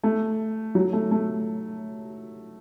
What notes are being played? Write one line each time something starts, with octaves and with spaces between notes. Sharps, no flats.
A3
F#3
A3
A3